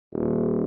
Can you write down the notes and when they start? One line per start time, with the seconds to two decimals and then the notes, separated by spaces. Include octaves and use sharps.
0.13 D#1